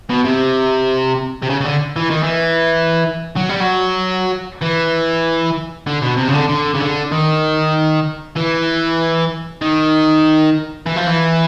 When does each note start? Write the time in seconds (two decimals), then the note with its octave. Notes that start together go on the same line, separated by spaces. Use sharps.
0.09 B2
0.24 C3
1.42 C3
1.50 C#3
1.61 C#3
1.65 D3
1.96 E3
2.10 D#3
2.24 E3
3.36 F#3
3.49 G3
3.61 F#3
4.62 E3
5.87 D3
6.02 B2
6.17 C3
6.28 C#3
6.34 D3
6.49 D3
6.75 C#3
6.80 D3
7.12 D#3
8.36 E3
9.62 D#3
10.86 E3
10.96 F3
11.07 E3